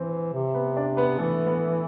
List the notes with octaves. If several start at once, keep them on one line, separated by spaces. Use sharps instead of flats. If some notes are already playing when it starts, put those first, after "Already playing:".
Already playing: E3 C4 C5
C3
B3 B4
D4 D5
B3 B4
E3 A3 A4
B3 B4